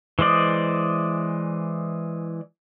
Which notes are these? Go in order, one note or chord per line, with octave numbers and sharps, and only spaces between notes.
E3 G#3 C5 D5 D#5